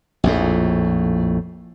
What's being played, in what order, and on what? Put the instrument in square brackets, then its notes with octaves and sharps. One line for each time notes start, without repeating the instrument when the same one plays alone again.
[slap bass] A#1 F2 A2